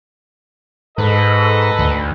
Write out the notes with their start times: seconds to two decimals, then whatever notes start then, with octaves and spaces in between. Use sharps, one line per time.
0.98 G#2 A4 B4 D#5
1.79 D2